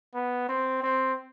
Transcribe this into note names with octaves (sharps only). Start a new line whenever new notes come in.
B3
C4
C4